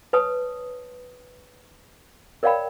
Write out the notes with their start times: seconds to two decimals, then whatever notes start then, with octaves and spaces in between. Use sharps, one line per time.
0.13 B4 C#5 A5 D#6
2.43 A#4 C#5 D5 F5 G5 B5